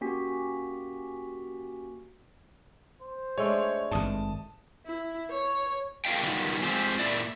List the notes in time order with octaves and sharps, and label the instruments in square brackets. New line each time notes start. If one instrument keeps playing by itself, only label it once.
[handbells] A#3 C#4 F#4 G4 G#5 B6
[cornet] C5
[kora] G#3 A3 D4 [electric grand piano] C#5
[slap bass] G#1 G2 [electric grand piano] A5 D#6
[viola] E4
C#5
[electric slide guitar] G#3 A#3 F4 D#5 F5 G5
D#3 F#3 G3 B3 F4
G#3 C4 D4 F4 G4 C5
A#2 E4 D5